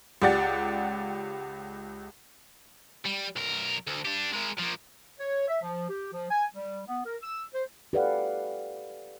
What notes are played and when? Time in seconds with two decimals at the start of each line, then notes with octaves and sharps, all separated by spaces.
0.22 C#2 G4 D5 F#5 A6
3.05 G3
3.36 B1 A#4
3.87 D2
4.05 D4 G4
4.33 G#3 A#4
4.58 F3 A#3
5.19 C#5
5.48 E5
5.62 F3
5.89 G4
6.13 F3
6.31 G#5
6.55 G3
6.87 B3
7.05 A#4
7.23 E6
7.54 C5
7.93 G4 A4 B4 D5 F5 F#5